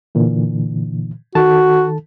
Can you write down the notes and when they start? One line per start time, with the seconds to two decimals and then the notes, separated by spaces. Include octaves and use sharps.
0.15 A#2 D3 E3
1.35 D#3 F#4 A4 A5